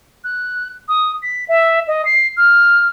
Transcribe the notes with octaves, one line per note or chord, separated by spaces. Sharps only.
F#6
D#6
B6
E5
D#5
C7
F6